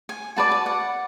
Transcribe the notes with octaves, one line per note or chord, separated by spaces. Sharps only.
G#5
F#4 B4 D5 A5
A5
F#5